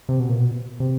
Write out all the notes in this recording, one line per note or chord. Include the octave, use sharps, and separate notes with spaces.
C3
B2
A#2
B2
C3